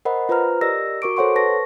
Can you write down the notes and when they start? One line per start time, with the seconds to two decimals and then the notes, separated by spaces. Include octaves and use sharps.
0.05 A#4 C5 D#5 F#5 B5
0.29 F4 B4 C5 A#5 F6
0.61 G4 A#4 D5 D#5 E6 A#6
1.02 F#4 A#4 C#6 D6 D7
1.17 A4 C5 C#5 F#5 C6 C#6
1.35 B4 A5 C#6 A#6